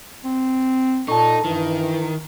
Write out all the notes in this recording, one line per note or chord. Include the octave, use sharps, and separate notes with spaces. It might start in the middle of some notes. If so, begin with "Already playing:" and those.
C4
A#2 D#4 A4 A5 C#6
G2 D#3 E3